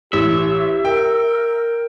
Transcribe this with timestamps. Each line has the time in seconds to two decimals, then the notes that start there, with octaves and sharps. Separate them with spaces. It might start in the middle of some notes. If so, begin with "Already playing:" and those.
0.13 A1 G4 E5
0.85 A#4 G5